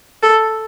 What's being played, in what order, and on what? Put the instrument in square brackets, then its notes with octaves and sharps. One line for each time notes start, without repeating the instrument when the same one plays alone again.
[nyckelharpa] A4